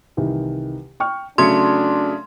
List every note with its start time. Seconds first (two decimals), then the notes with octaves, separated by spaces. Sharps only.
0.17 C2 D#3 E3
1.00 G5 C#6 F6
1.38 C#3 F#3 A3 D4 C6 G#6 C#7